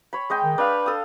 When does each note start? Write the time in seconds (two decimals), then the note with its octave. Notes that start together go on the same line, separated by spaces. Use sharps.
0.13 C#5 B5
0.30 G#3 D#5 G5
0.44 D#3
0.58 D4 B4 F5
0.86 A4 D#6